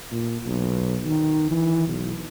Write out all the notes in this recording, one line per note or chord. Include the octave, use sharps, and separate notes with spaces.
A#2
B1
D#3
E3
B1